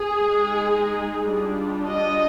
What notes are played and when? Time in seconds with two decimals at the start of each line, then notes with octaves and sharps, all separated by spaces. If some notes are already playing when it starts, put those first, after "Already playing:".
Already playing: G#4
0.24 G#3 D#4
1.32 G3 D4 F4
1.87 D#5